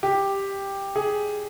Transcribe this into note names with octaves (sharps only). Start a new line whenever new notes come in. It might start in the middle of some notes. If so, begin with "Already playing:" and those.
G4
G#4